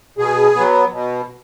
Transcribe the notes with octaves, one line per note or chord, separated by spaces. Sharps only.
B2 G#4
F#3 B3
B2